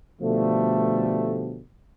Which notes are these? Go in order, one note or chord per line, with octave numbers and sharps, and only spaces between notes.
B2 D3 F3 G3 A3